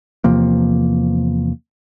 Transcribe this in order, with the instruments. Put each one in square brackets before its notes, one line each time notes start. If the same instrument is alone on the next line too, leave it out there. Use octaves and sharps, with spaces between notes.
[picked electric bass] E2 C3 F3 A#3